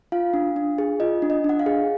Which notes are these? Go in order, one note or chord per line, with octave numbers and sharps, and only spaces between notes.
F4 F5
D4
D4
G#4
F4 D#5
D4
D#5
D4 F#5
F5
G#4